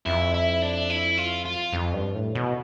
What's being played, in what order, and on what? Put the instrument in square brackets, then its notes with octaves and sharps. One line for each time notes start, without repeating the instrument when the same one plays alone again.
[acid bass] F2 [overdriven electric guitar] E4
[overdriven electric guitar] E4
D4
E4
F4
F4
[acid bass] F2
G2
A2
B2